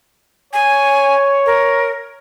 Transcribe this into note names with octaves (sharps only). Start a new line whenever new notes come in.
C#5 G#5
A#4